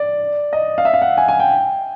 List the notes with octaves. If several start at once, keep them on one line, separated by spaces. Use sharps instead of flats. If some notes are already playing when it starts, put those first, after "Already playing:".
Already playing: D5
D#5
F5
E5
F5
F#5
G#5
G#5
G5